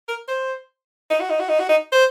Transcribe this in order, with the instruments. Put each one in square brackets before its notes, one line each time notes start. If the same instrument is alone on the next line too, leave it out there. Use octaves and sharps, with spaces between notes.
[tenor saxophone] A#4
C5
D#4
F#4
D#4
F#4
D#4
F#4
D#4
C5